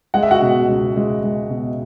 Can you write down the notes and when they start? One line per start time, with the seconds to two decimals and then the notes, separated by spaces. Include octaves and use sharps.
0.14 G#3 F#5
0.23 E5
0.31 F#4 F#5
0.42 B2
0.68 C#2
0.96 G#3
1.23 G#3
1.50 B2